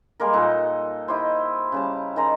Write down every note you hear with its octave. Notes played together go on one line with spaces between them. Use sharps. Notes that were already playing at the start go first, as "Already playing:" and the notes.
G3 G#3 A#3 A#4
A#2 D#4 A4 F#5
D#4 E4 G4 C5
C#3 G3 A5
D#3 G#4 A#5 C6